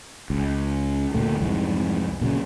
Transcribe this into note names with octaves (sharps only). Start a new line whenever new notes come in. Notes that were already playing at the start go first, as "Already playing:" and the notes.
C#2
D2 A#2 A3
C2 F2 G#2 E3
A#2 C#3 F#3